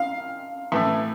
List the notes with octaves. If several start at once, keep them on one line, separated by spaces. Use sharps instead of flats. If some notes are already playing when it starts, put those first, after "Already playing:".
Already playing: F5
A2 E3 A3